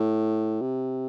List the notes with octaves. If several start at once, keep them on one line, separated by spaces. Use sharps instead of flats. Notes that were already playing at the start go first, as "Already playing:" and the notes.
Already playing: A2
C3